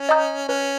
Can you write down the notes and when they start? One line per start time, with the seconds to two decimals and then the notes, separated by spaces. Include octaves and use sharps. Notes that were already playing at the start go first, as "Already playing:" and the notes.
Already playing: C#4
0.09 D#5 A#5 D#6 G6
0.48 C#4 B4